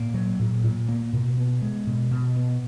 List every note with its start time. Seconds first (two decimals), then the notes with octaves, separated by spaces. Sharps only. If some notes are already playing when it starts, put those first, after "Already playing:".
Already playing: A#2 A#3
0.14 F#3
0.39 A#2
0.64 A#2
0.89 A#3
1.13 B2
1.38 B3
1.62 G#3
1.87 B2
2.11 B2
2.36 B3